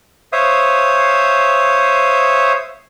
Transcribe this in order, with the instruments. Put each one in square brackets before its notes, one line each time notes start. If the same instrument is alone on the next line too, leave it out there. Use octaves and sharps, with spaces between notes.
[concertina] C5 C#5 E5 F5 D#6